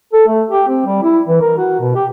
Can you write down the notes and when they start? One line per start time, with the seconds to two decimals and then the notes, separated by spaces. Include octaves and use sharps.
0.13 A4
0.28 A3
0.51 G4
0.68 C4
0.86 G3
1.03 E4
1.28 E3
1.41 A#4
1.58 F#4
1.80 B2
1.95 G4